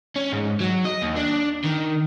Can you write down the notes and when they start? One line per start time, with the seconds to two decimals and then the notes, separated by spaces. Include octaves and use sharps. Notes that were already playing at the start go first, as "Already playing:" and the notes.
0.16 C#4
0.32 G#2
0.60 F#3
0.85 D#5
1.02 D#2
1.16 D4
1.65 D#3